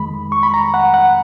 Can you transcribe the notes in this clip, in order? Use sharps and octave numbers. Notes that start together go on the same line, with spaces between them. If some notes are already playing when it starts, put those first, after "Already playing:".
Already playing: F2 D#3 G#3 B5
C#6
B5
A#5
F#5
F#5